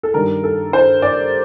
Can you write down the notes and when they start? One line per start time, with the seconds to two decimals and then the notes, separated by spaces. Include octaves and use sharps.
0.03 A4
0.14 G2 D#3 G3 A#4
0.44 A4
0.73 C5
1.02 D5